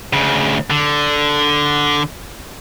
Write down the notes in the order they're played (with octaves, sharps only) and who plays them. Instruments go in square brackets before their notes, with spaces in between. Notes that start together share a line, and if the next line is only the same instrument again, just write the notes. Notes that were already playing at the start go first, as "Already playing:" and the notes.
[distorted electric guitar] D2 C#3
D3